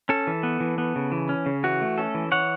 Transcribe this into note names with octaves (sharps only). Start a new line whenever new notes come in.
C#4 A4
E3
B3
E3
B3
C#3
E3
C#4
C#3
E3 F#4
A3
C#4 A4
E3
E3 C#5 F#5